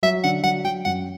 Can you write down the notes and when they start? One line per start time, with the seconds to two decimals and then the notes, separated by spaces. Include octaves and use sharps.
0.03 F#3 E5
0.24 D3 F#5
0.43 F#3 F#5
0.64 F#3 G5
0.85 F#2 F#5